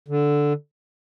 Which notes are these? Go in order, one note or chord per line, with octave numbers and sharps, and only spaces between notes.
D3